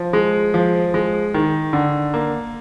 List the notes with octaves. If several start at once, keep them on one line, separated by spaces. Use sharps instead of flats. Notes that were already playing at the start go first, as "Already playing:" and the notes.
Already playing: F3
G#3
F3
G#3
D#3
D3
A#3